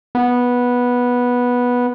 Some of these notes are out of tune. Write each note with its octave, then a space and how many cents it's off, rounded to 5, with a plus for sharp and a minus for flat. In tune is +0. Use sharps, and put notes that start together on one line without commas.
B3 -10